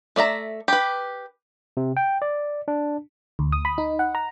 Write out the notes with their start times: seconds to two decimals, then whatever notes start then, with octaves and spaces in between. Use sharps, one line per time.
0.16 A3 D5 E5 A#5
0.68 G4 B4
1.77 C3
1.97 G5
2.22 D5
2.68 D4
3.39 D2
3.52 D#6
3.65 B5
3.78 D#4
3.99 F#5
4.15 A#5